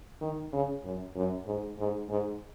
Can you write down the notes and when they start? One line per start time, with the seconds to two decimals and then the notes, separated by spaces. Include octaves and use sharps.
0.21 D#3
0.52 C#3
0.84 F#2
1.16 F#2
1.46 G#2
1.79 G#2
2.09 G#2